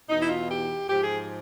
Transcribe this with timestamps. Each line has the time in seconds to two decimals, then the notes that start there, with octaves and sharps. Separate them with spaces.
0.09 E2 B2 D#4
0.21 E4
0.29 F4
0.50 G4
0.89 G#2 F3 G4
1.03 G#4